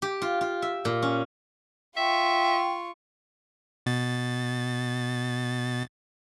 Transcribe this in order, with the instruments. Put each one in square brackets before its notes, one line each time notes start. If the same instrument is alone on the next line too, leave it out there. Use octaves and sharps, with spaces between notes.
[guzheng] G4
F4
F4
E5
A#2
C#4
[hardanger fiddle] F4 C#6 [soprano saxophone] E5 [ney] G5
[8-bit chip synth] B2 A6